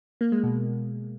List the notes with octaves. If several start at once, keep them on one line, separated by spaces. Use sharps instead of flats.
A#3
G#3
B2